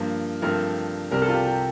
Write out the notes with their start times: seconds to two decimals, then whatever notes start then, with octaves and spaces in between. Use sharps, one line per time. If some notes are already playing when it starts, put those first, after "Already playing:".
Already playing: G2 F3 A#3 F4
0.42 G2 F3 A3 C4 A#4
1.11 C2 C3 G3 C4 A#4
1.22 A4
1.28 F4
1.34 G4
1.45 G4